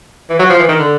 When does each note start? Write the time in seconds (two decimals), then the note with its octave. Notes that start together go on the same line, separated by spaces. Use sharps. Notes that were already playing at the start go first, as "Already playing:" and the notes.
0.30 E3
0.39 F#3
0.49 F3
0.59 E3
0.69 D#3
0.79 D3